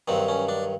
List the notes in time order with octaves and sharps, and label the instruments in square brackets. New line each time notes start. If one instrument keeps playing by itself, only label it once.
[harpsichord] G2 D#3 F#3 C4
C#4
D4